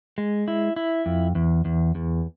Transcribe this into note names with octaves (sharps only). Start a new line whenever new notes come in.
G#3
E4
E4
F2
E2
E2
E2